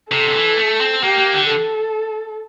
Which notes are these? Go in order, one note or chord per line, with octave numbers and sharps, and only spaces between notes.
C3 A4
D3
E3
A3
C4
A#3 G4
A#3
D3
A4